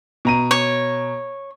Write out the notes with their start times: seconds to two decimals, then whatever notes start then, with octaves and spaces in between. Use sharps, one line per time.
0.25 B2 A#5 D#7
0.51 C#5